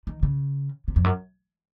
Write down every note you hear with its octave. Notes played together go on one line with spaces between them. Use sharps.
D#3
C#3
C3
F2
F#2